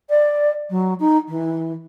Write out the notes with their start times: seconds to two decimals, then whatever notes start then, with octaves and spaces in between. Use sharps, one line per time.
0.10 D5
0.70 F#3
1.00 D#4
1.28 E3